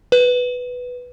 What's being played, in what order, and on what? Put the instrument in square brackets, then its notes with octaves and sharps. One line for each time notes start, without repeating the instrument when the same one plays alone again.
[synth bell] B4